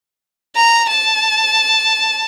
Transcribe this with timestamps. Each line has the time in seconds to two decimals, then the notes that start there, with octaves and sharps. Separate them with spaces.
0.56 A#5
0.91 A5